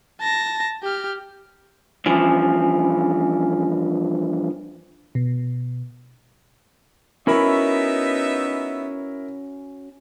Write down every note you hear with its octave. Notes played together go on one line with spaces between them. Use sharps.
A5 A#6
G4 F6
G2 E3 F3 C#4 G#5
B2
B3 C#4 D#4 E4 F#4 A#4 E5 B5